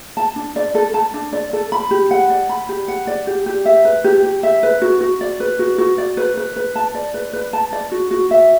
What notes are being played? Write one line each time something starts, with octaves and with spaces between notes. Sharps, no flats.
A5
D4
D5
A4
A5
D4
D5
A4
B5
G4
F#5
D5
B5
G4
F#5
D5
G4
G4
E5
B4
G4
G4
E5
B4
F#4
F#4
D5
B4
F#4
F#4
D5
B4
B4
B4
A5
D5
B4
B4
A5
D5
F#4
F#4
E5